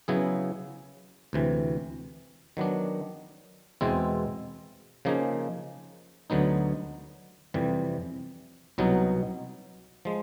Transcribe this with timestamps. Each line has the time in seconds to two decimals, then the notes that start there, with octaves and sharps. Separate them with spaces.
0.08 C#3 F#3 B3 E4 G#4
1.33 D2 C3 E3
2.57 D#3 F#3 B3 D4
3.81 E2 B2 G#3 C4 E4
5.05 C#3 F3 A#3 D#4 G#4
6.30 D2 D3 F#3 B3 D#4
7.54 F2 C3 E3 G3
8.78 C2 B2 F#3 B3 D#4
10.05 F3 G#3